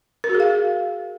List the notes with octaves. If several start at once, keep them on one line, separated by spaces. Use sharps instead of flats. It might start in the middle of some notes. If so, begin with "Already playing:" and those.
A#4
F#4
G#4
F5